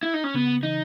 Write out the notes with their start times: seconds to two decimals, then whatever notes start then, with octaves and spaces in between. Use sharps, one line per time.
0.03 E4
0.14 D#4
0.24 C#4
0.34 C#3 B3
0.63 E3 D#4